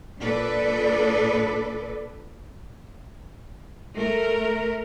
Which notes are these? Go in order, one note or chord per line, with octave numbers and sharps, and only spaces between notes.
A#2 D4 A4 B4 D5
A3 A#4